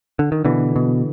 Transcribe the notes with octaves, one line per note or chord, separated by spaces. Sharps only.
D3
D#3
B2 D3 E3
B2